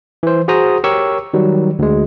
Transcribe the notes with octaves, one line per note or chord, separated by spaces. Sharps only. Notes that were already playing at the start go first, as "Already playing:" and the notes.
E3 C5
F#4 G#4 C5 A#5 D#6
G4 A#4 C#5 C#6 E6
D#3 F#3 G3
D2 G#3